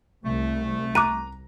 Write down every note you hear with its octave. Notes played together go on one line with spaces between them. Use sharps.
C2 A3
A#5 D6 F#6 D#7